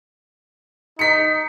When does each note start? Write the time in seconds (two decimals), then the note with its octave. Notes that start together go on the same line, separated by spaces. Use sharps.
0.99 D#4 B6 C#7